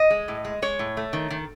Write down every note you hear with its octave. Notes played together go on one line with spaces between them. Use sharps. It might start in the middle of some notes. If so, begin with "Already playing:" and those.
Already playing: D#5
G#3
A2
G#3
G#3 C#5
A2
A3
D#3
D#3